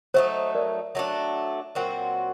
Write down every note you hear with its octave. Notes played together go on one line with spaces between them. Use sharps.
F#3 A3 D#4 C5
A#4 D5
F#3 A3 D4
A#2 F#3 C4 F#4